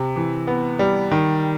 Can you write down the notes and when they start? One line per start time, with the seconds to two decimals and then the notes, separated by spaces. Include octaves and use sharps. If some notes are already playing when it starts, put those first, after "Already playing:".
Already playing: C3
0.16 E3
0.47 B3
0.79 G3
1.11 D#3